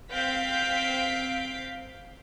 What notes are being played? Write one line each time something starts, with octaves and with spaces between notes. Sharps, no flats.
C4 F5 G6 B6 D7